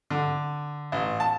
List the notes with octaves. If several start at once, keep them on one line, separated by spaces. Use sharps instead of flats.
D3
A1
A5